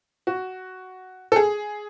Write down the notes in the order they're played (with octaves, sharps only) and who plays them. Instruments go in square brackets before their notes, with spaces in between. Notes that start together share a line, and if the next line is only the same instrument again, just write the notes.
[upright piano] F#4
A4
G#4